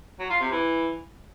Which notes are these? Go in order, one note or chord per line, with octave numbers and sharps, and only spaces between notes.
F#3
F4
C3
E3